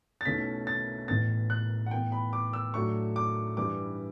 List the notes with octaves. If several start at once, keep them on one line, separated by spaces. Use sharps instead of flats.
A6
B1 B2 A3 C#4 E4 B6
A6
A1 A2 E3 B3 A6
F#6
F#5
A2 E3 B3 G5
B5
D6
E6
A2 F#3 A3 D4 C#6
D6
G2 E3 G3 D6